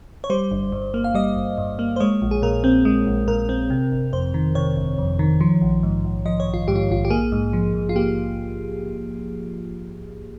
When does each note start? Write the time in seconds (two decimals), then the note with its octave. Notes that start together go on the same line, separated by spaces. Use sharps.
0.24 C#5
0.30 G3 C5
0.51 G1
0.72 G2
0.94 A#3
1.04 F5
1.15 G3 D#5
1.37 G1
1.58 G2
1.79 A#3
1.96 C5
2.00 G#3 C#5
2.22 A#1
2.31 G#4
2.42 A#2 A#4
2.64 C4
2.85 G#3
3.07 A#1
3.28 A#2 A#4
3.49 C4
3.70 C3
3.91 G1
4.13 F2 C5
4.34 D#3
4.55 C3 C#5
4.77 G1
4.98 F2
5.19 D#3
5.41 F3
5.62 A#1
5.83 G#2
6.04 A#1
6.25 F3 D#5
6.40 C#5
6.47 A#1
6.54 F4
6.68 G#2 G4
6.76 F4
6.89 A#1 F4
7.05 G4
7.10 A#3 G#4
7.32 G#2
7.53 F3
7.74 G#2
7.89 F4
7.96 A#3 G4